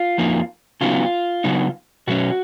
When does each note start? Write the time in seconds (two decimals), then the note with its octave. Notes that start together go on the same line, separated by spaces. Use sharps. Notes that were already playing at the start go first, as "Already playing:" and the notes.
Already playing: F4
0.18 F2 F3 A#3 D#4
0.81 C#3 F#3 B3 D#4 F4
1.44 C#3 F#3 B3 D#4
2.07 B2 F#3 C#4 F#4